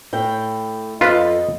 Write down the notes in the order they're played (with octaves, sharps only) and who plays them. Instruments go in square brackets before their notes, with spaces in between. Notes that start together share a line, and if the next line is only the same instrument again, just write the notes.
[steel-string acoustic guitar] A2 G5
[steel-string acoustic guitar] F2 A4 [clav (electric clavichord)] F4 B4 [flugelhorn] D#5